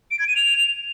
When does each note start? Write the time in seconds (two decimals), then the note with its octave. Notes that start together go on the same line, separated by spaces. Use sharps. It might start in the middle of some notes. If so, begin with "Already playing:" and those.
0.11 D7
0.19 G#6
0.27 D#7
0.36 F7